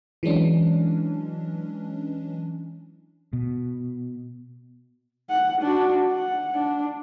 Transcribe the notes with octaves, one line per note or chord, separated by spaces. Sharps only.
E3 F#3 G#3 C#4 D4
B2
F#5
D4 F#4
F#5
D4